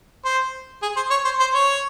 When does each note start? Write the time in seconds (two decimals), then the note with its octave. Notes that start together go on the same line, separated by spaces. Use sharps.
0.25 C5
0.82 G#4
0.96 C5
1.10 C#5
1.24 C5
1.40 C5
1.54 C#5